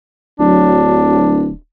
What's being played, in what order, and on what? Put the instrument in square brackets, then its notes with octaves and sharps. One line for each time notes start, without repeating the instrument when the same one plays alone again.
[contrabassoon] D1 [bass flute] F#3 [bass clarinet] D4